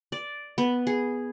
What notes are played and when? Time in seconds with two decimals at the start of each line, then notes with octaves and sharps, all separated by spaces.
0.12 D5
0.58 B3
0.87 G#4